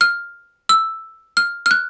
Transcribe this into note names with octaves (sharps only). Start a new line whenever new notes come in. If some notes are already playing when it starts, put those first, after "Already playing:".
F6
E6
F6
F6
F#6